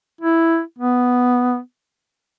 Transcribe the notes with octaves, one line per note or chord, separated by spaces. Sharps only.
E4
B3